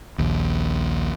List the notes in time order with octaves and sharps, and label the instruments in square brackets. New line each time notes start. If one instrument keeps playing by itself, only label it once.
[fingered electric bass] A#1 D#2